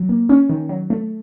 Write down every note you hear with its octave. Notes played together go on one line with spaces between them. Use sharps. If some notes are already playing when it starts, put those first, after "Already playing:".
Already playing: F#3
A#3
C#4
D#3
F#3
A3